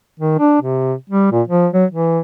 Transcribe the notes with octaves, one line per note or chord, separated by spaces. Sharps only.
D#3
D4
C3
G3
A#2
F3
F#3
E3